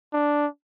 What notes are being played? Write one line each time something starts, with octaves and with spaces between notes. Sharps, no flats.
D4